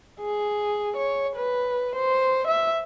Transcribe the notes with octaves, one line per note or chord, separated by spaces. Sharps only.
G#4
C#5
B4
C5
E5